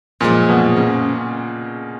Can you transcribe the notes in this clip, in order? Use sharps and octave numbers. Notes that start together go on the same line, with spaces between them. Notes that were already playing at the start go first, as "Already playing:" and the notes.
F#2 A#2 F3 G#3
B2
C#3